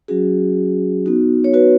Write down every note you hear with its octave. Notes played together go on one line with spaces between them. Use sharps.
F#3 C#4 F#4 G#4
B3 D#4 F#4
C#5
F#4 B4